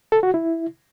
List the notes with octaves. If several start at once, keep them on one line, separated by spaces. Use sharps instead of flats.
A4
F#4
E4